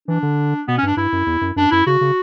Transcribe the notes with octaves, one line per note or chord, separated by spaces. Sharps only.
E3 D4
D3
B2 B3
C#4
G2 D4
G2 E4
F#2
E2
F#2
F#2 D4
F#2 E4
C#3 F#4
C#3